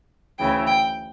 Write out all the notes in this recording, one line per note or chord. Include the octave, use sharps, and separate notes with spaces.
D2 C#3 E3 G5
G5